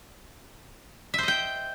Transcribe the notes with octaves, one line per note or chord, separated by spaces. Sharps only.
C5 D#5 E5 G5